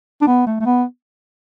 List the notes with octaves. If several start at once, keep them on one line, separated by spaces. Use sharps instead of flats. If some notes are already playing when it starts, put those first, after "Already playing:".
D4
B3
A3
A3
B3